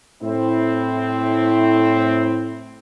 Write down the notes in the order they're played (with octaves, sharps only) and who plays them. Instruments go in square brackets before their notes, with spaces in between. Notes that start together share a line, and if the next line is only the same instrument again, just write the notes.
[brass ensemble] A2 C4 E4